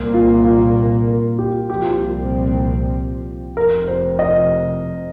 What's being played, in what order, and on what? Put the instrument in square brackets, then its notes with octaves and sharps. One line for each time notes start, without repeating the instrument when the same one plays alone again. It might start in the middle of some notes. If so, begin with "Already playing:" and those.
Already playing: [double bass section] C2 A#2 A#3
[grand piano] F4
F4
A#4
G4
[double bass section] C2 A#2 F3 C4 [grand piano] G4
[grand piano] F4
G4
[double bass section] F1 F2 C3 [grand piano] A#4
[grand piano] C5
D#5